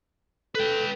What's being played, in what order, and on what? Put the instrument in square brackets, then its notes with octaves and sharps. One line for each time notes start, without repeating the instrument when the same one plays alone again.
[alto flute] A4 [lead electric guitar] B4 G5